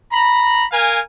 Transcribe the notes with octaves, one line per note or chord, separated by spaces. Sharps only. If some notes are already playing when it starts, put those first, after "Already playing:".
A#5 B5
A#4 F5 G#5